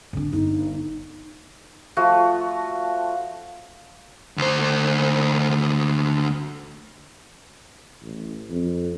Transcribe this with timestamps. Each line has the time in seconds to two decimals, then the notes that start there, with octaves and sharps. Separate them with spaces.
0.13 D3 D4
0.33 G1 D#4
1.97 F3 A3 F#4
4.38 D2 C5
8.02 A1
8.50 F2